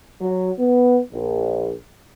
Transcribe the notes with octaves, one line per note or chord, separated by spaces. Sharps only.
F#3
B3
A#1